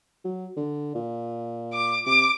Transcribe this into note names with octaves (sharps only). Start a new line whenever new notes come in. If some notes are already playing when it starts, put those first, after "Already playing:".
F#3
D3
A#2
D6
C3 D6